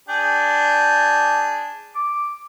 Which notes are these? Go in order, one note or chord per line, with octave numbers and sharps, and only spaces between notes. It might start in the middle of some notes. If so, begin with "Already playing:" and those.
D4 G#4 G5
D6